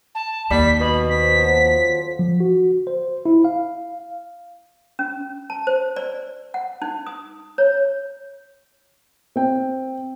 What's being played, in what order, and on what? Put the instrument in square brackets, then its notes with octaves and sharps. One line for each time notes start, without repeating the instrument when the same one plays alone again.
[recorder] A5
[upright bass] D#2 [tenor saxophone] G3 [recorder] B6
[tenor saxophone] B2 [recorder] B5
[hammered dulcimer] C4 [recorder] B6
[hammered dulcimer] F3 F#3 A4
[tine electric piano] F3
F#4
C5
E4
F5
[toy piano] C#4
A5
C5
D5
F#5
D#4
D#6
C#5
[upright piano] C4 G5